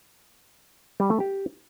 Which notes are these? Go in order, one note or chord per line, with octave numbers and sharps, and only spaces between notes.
G3
A3
G4